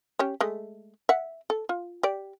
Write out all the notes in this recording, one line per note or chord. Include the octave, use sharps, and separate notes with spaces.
C#4 G4 C#5
G#3 A3
E5 F#5
A4
F4
G4 D5